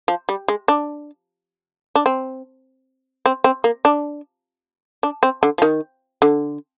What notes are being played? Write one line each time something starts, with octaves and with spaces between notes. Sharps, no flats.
F3
G3
G#3
D4
D4
C4
C4
C4
A#3
D4
D4
C4
D3
F3
D#3
D3